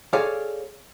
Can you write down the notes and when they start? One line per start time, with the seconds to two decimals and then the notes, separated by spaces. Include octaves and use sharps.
0.13 G#4 A4 C#5 D5 F5